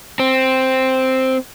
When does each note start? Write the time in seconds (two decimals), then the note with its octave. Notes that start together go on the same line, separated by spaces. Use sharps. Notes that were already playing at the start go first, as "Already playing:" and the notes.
0.19 C4